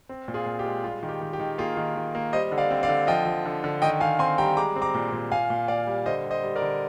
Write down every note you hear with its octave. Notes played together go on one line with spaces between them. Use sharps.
C4
A#2
F4 G#4
A#2
G4
G#3
G3 F4
D#3
G4
D#3
G4
D#3
A#3 F4 G#4
D#3
D#3
A#3
G3 C5 D#5
D3
D5 F5
C4
D5 F5
D3
F3 D#5 G5
F3
D3
D3
D#3 D#5 G5
D#3 F5 G#5
C4 G#5 C6
G3 G5 A#5
G#3 A#5 D6
C4
A#5 D6
A#2
A#2
A#2 F5 G#5
A#2
A#2 D5 F5
G3
D3 C5 D#5
G3
C5 D#5
G3
A#4 D5
D3